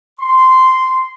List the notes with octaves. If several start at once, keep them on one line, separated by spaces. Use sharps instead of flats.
C6